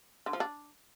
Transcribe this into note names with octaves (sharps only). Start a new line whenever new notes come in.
D3
F3
D4